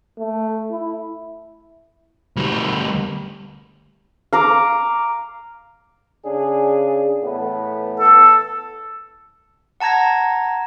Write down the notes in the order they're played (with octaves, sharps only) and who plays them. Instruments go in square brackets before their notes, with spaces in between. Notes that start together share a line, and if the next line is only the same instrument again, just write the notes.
[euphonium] A3
E4
[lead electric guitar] D2 G3
[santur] F5 A#5 D6
[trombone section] C#3 D4 G#4
A2 E3 B3
[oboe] A4
[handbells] F#5 A5 A#5 G#6 A#6